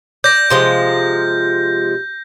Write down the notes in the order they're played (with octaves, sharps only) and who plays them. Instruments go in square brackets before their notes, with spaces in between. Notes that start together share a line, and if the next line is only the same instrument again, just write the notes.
[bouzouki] D5 [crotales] G6 A#6
[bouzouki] C3 F3 G#3